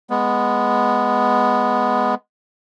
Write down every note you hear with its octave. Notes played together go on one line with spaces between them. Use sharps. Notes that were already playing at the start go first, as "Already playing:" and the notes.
G#3 B3